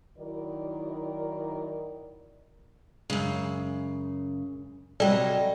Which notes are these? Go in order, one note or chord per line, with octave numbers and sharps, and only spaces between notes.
D#3 F#3 D#4 E4 A#4 D5
F#2 C#3 G#3
C3 F#3 G3 A4 D5 D#5 G5